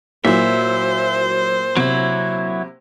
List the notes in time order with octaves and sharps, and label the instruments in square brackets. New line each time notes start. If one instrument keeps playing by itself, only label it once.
[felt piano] A#2 [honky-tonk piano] F#3 E4 [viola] C5 [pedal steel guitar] E5
[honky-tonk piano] C3 [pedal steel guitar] F#3 E4